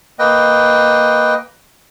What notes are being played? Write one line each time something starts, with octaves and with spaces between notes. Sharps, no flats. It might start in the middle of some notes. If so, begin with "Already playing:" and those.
A#3 B4 D#5 G5